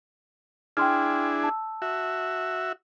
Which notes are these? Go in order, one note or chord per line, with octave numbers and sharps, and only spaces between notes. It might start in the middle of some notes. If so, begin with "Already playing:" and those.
D4 E4 G#4 G5 C6 F6
A5 E6
F#4 E5